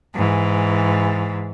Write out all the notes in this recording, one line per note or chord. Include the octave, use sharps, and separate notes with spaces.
G#2 E3